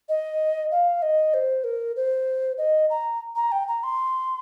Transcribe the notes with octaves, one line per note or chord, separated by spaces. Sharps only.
D#5
F5
D#5
C5
A#4
C5
D#5
A#5
A#5
G5
A#5
C6